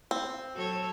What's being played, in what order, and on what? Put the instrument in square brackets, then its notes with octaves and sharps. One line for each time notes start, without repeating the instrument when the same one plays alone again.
[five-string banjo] C4
[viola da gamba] F#3 A4 C#5